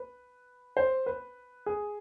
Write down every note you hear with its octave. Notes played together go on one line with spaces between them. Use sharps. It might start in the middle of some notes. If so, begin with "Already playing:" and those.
Already playing: B4
C5
B4
G#4